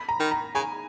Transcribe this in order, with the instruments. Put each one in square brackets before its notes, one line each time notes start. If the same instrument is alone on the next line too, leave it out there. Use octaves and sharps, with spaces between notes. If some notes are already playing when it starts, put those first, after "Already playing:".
Already playing: [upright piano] B5
A#5
[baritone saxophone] D#3
[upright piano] A#5
[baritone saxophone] C#3 [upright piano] G#5